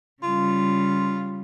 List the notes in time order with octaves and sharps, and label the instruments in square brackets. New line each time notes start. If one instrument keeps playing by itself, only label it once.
[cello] C#3 G3 [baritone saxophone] F4